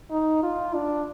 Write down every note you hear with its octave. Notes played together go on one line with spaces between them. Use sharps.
D#4
F4
D4